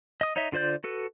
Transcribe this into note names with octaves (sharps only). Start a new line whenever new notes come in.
D#5 D#6
D#4 C#5 D#5 E5
D3 F4 C5 D5 G6
F#4 A4 B4